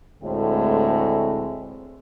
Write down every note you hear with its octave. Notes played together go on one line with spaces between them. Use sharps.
D2 A2 G#3 C4